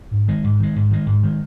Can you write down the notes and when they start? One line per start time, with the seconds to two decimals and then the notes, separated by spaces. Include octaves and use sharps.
0.11 G#2
0.28 D#3 G#3
0.44 G#2
0.60 D#3 G#3
0.76 G#2
0.91 D#3 G#3
1.06 G#2
1.23 D#3 G#3